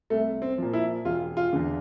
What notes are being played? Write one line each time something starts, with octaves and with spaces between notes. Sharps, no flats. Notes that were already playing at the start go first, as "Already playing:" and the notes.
C2 A3
C4
A#2 F3
E4
E1 F4
F4
E2 D3